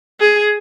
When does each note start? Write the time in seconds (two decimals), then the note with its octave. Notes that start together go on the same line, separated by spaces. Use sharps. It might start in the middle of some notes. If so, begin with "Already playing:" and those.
0.20 G#4